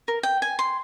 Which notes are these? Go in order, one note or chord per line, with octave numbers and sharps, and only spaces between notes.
A#4
G5
G#5
C6